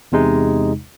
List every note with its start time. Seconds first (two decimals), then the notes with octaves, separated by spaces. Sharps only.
0.12 E2 C3 G#3 D#4